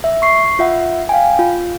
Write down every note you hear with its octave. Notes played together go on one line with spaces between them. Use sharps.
E5
C#6 C7
F4 E5 F#5
F5 G5 G#5
F4